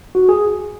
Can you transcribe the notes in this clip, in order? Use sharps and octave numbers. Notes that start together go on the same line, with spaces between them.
F#4
G#4